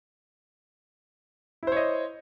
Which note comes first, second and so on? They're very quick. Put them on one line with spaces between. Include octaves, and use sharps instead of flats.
E4 C5 C#5 D#5